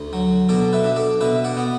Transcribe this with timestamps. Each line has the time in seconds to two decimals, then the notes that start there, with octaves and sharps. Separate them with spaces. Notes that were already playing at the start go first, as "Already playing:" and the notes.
Already playing: D2
0.13 F#3
0.49 B2 A4 D5
0.73 B4 E5
0.84 D4
0.96 A4 D5
1.21 B2 B4 E5
1.44 D5 F#5
1.57 B3